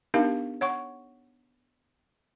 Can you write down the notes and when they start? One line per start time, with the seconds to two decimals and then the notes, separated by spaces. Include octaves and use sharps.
0.14 B3 D4 D#4 G4 A#4 F5
0.61 C#5 F#5 C#6